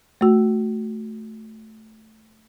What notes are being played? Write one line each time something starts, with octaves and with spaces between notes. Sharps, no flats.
A3 F#4